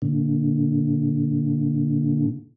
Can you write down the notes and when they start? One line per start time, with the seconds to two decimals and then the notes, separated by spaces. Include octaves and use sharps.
0.02 A#2 D3